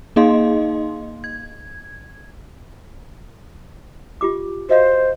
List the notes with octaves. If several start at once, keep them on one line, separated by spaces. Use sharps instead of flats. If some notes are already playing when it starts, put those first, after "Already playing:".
A#3 D#4 G#4 D#5 F5 C6
G#6
F4 G4 D6
F#4 C5 D#5 F5